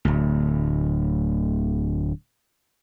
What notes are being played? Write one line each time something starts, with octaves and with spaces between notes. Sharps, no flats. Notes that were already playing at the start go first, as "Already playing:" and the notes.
D1 D2